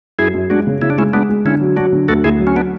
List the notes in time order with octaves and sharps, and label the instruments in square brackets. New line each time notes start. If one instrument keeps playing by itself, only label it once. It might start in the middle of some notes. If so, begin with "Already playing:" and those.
[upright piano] F#2 [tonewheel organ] E4 G#4
[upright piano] F#2
[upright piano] G#3 [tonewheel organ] D4 F#4
[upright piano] C#3
[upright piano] C#3 [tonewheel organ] E4
[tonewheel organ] D4
[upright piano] G#3 [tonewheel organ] C#4 E4
[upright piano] G#3 [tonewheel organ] B3 D4
[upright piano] G#3
[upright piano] D3 [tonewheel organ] C#4 E4
[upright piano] F#3
[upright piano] F#3 [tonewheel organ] D4 F#4
[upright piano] D3
[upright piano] D2 [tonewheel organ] F#4 A4
[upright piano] D2 [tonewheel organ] E4 G#4
[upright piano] F#3
[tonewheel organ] C#4
B3 D4